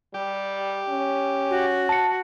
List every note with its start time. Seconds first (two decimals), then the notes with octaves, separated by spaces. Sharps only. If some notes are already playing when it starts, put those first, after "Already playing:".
0.14 G3 G4
0.89 C#4
1.50 F#4
1.89 A5 C#7